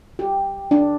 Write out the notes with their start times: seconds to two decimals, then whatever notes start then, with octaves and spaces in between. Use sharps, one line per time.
0.19 G4
0.71 D4